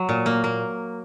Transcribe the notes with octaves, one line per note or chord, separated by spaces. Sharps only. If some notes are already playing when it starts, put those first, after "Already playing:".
Already playing: F#3
A#2
A#3
A#3